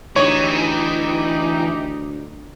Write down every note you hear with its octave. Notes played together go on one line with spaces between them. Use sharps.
D2 E3 D#4 G4 C#5